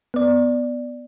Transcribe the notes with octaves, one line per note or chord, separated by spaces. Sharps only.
B3 D5